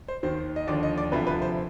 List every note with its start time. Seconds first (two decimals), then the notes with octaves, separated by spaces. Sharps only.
0.08 C5
0.23 D#2 D#3 C5
0.56 D#5
0.68 D#2 D3 F3 D5
0.83 D#5
0.98 D5
1.12 D2 C3 F3 B4
1.27 B4
1.42 C5